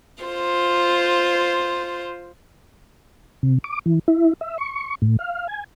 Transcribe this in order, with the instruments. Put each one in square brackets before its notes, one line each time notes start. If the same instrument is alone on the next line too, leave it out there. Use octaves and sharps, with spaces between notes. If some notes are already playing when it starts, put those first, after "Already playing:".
[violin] F4 C5
[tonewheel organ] C3
D6
E3
E4
E5
C#6
A2
F5
G#5